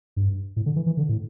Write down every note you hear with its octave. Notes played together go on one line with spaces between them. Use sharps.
G2
A2
D3
E3
E3
D3
A2